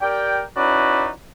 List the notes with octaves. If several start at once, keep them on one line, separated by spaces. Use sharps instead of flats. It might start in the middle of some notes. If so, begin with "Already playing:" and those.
G4 A#4 D5 G5
C#4 D#4 E4 F#4 B4 D5